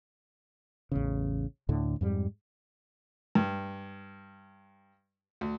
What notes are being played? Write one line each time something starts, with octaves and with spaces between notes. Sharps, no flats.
A1 E2 C#3
D2 A2 D3
F2 G#2 G3
G2
D2